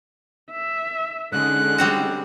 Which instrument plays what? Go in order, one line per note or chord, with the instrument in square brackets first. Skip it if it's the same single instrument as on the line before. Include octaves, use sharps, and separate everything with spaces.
[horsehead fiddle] E5
[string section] D3 G#3 [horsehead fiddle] C#4 D#4 [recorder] F#6
[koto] G3 C4 F#4